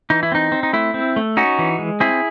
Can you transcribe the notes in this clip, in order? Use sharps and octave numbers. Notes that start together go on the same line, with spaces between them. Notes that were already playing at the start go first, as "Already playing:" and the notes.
E3 D#4
E4
C4 D#4
C4
D#4
A3 E4
C4
A3
C#4 D#4 F#4
E3
G#3
C4 E4 G#4